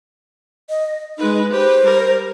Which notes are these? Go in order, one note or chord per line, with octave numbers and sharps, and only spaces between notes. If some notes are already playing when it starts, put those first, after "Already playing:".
D#5
G#3 D#4 B4
G4 B4 C5
G3 A#4